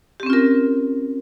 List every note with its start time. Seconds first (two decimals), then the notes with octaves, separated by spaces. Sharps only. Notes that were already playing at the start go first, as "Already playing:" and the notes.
0.20 G4
0.23 C4
0.26 C#4
0.30 F4
0.33 A#4